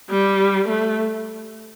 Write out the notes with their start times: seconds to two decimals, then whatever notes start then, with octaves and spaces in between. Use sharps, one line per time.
0.10 G3
0.69 A3